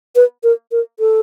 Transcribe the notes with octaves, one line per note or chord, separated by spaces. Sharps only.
B4
A#4
A#4
A4